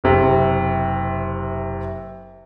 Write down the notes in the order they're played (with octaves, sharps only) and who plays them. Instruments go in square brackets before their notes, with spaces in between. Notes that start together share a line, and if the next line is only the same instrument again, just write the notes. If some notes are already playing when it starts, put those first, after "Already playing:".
[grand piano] F#1 C3